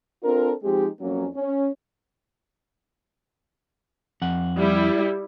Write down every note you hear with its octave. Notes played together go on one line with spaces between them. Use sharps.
C4 D4 F4 A4 A#4
F3 G#3 C4 D#4 G4
F2 F#3 A#3 C#4
C#4
F2 F#5
G3 E4